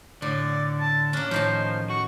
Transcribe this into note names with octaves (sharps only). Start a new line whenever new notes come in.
A2 D3 D5
A5
A#3 C#4 D4
A2 D#3 F3 C5 A5
F#4 C#6